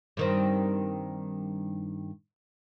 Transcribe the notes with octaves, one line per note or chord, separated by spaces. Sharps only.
G2 D#3 C4